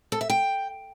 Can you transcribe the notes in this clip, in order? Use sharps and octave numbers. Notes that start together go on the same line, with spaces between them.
A4
E5
G5